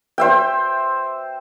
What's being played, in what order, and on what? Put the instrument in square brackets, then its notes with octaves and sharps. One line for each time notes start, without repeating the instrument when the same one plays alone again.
[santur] C5 E5 G5